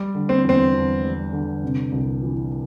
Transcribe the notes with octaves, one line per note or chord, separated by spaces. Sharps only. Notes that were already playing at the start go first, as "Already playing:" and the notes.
Already playing: G3
D3
C4
E2 C4
E2
G3
D3
C3
C2
E3